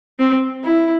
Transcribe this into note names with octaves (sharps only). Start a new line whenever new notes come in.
C4
E4